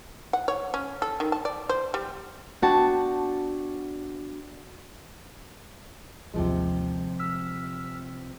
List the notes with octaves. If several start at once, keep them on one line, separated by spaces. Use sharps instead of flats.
F#5
C#5
C#4
A4
D#3
A5
D5
C5
G3
B3 D4 F#4 G5 A5
A1 D#2 C3 F3 G#3
E6 F6 B6